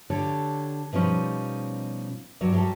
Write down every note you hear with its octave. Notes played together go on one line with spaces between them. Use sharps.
D3 G4 A4 C#5 D5
B2 F3 G3 C#4 D#4
G2 F#3 D5
F#3 G3 F4 G4 A4